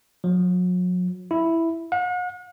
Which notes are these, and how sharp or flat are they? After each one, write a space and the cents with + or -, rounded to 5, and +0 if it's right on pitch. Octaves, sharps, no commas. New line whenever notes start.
F#3 -40
E4 +0
F#5 -45